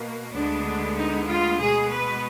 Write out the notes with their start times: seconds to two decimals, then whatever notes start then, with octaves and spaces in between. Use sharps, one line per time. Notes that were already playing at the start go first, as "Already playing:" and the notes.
Already playing: B2 A#3
0.33 D2 D3 G#3 B3 D4
0.96 D#4
1.28 F4
1.59 B2 G#3 B3 G#4
1.91 B4